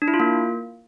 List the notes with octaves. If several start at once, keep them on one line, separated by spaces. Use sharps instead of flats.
D4
E4
F4
A#3